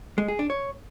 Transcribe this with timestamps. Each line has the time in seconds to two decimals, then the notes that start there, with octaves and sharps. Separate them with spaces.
0.18 G#3
0.28 G#4
0.39 D4
0.50 C#5